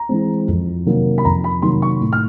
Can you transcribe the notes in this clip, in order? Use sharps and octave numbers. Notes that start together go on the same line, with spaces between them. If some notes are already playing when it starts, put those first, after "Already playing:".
Already playing: A#5
E3 G#3 C4
F2
C3 D#3 F#3 A#3
B5
F2 A#5
B5
C3 D#3 F#3 A#3 C6
C#6
A2
F6